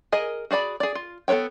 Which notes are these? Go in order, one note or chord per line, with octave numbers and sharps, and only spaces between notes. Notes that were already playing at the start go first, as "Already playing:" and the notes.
G#4 A#4 D#5 G#5
F#4 G#4 D5 B5
G#4 D5
F4
B3 A4 B4 C#5 G5